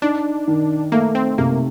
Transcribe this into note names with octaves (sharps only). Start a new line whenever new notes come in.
D4 D#4
D#3
A3 A#3
C4
C3 A#3